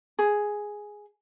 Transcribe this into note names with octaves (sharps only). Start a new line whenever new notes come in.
G#4